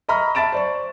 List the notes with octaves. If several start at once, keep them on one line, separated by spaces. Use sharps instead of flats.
D#5 E5 A#5 B5 C#6 F6
E5 A5 B5 A6 D7 E7
C5 D5 C#6